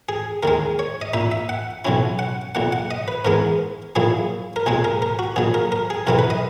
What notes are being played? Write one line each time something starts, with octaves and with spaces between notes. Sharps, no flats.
G#4
D#2 D#3 G#3 A#4
C#5
D#5
A#2 A#3 D#4 E5
E5
F#5
B1 B2 F#3 C#4 E4
F#5
B1 A#2 A#3 F#5
F#5
D#5
B4
G#2 E3 G#3 B3 A#4
A#1 A#2 F#3 A#3 E4 G#4
A#4
B1 A#2 G#3 G#4
A#4
A#4
F#4
A#1 A#2 F#3 G#4
A#4
A#4
G#4
B1 B2 F#3 B3 E4 A#4
B4
D#5